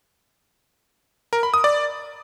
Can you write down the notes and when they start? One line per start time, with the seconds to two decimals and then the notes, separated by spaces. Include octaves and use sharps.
1.33 A#4
1.43 B5
1.54 D#6
1.64 D5